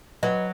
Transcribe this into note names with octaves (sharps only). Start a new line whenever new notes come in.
F#3 B4 D#5